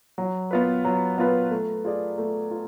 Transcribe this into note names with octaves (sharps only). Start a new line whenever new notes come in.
F#3
B3 F4 B4
F#3
B3 F4 B4
A3
F4 G#4 D5
A3
F4